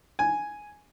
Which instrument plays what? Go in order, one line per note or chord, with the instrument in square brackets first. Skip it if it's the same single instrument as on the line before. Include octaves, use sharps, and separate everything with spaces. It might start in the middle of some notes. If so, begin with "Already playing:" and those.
[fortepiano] G#5